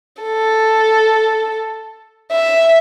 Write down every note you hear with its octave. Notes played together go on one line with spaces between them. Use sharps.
A4
E5